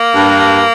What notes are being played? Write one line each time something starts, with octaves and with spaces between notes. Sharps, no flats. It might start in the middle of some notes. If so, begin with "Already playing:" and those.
Already playing: A#3
G2